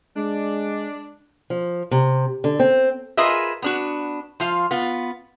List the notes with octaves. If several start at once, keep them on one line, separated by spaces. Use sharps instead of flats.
G#3 D4
F3
C3
D3
C4
F4 G#4 A#4 B4 D#5 E5
B3 D4 F#4
F3 F4 F5
B3 F4